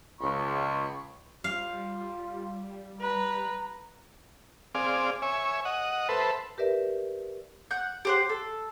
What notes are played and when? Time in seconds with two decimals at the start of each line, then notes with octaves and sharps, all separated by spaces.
0.21 C#2 B5 C#6
1.44 G3 F4 F5
3.01 B4 A#5
4.75 C4 G#4 D5 F5
5.22 C#5 E5 G#5
5.65 D#5 F#5
6.09 A4 B4 C5 E5
6.58 G4 A#4 B4 D5 E5
7.71 F#5 G6
8.05 G4 C5 F#5
8.29 A4